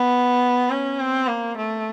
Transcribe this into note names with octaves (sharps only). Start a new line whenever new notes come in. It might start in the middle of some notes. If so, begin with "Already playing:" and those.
Already playing: B3
C#4
C4
A#3
A3